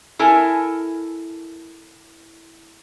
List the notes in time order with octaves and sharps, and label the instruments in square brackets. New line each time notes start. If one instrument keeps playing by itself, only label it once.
[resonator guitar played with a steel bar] E4 A4 A#4 G#5